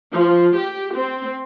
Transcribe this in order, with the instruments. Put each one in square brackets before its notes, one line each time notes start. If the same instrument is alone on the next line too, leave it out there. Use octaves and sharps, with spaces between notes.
[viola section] F3
G4
C4